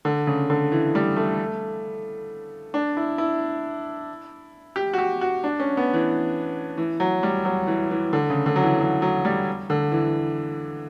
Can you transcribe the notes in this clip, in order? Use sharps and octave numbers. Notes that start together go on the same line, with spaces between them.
D3
C#3
D3
E3
G3
A3
D4
E4
E4
G4
F#4
G4
F#4
D4
C#4
B3
E3
E3
F#3
G3
F#3
E3
E3
D3
C#3
D3
F#3
E3
F#3
F#3
G3
D3
E3